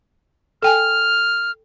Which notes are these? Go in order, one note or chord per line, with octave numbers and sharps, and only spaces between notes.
A4 G5 G#5 F6